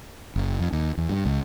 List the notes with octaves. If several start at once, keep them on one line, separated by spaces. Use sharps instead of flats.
F#1
F2
D#2
E2
G2
C#2